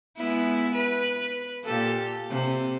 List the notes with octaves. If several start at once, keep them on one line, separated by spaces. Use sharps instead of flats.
G#3 B3 E4
B4
A#2 G4 A4
C3